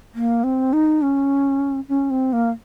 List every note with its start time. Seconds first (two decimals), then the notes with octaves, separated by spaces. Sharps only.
0.15 A#3
0.44 C4
0.73 D#4
1.02 C#4
1.89 C#4
2.10 C4
2.33 A#3